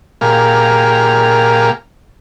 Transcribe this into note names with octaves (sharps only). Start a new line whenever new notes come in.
A#2 A#3 G4 G#4 F5 F6